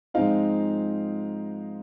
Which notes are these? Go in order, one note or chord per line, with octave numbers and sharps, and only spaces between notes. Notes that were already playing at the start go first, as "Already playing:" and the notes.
G#2 F3 G#3 C4 D#4 F4 F5